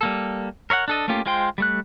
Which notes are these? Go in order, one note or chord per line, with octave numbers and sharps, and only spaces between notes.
G3 A#3 A4
A#4 C#5 E5 F#5
D4 A4 D#5
A3 A#3 C#4 F4 G4
G#3 F4 C5 G5 C6
G3 A3 F#6